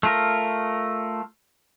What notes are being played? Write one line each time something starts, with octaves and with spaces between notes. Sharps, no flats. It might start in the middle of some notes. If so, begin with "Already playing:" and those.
A3 F4 A#4